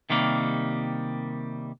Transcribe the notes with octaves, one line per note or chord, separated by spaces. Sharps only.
C3 D#3 G3 A#3